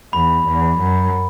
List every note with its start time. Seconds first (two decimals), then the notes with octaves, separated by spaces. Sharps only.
0.13 E2 B5
0.47 E2
0.79 F#2